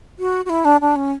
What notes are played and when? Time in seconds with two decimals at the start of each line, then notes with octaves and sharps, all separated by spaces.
0.19 F#4
0.45 F#4
0.50 E4
0.65 D4
0.81 D4
0.96 C#4